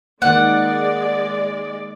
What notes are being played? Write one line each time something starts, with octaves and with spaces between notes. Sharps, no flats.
D#3 G#3 A#3 D5 F#5